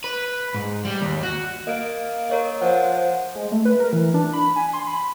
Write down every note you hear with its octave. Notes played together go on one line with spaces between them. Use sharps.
B4
G#2
G3
D#2
F#4
A#3 D#5 D7
A#4 C#5 D#5
F3 C5 F#5
G#3
A3
B4
A#4
E3
D4
B5
G#5
C6
B5